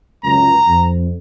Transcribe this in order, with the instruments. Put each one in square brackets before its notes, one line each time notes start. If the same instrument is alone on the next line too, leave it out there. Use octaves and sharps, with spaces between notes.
[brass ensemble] C#2 F#2 [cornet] A#5
[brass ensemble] F2